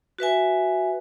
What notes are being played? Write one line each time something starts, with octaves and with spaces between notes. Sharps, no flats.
F#4 B4 E5 G#5